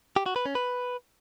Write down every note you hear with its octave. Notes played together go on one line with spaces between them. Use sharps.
G4
F#4
B4
C#4
B4